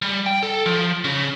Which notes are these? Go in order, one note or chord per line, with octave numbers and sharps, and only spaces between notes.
G3
G5
A4
F3
C#3